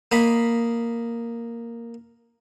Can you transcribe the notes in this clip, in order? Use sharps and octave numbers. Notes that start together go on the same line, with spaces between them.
A#3 D#5 B5